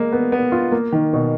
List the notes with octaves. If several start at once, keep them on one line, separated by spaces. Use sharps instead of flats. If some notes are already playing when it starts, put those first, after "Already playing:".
Already playing: G#3 A#3
B3
B3
F4
A#3
D#3
B2